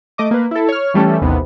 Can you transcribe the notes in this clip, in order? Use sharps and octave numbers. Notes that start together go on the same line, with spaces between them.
A3 D#5 D6
A#3 B4
E4 A4
C#5 F6
E3 G3 A3 C#4 A4
A1 D#2 C3 B3